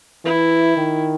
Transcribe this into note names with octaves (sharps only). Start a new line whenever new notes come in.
E3 E4
D#3